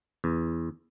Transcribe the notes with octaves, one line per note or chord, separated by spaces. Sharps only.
E2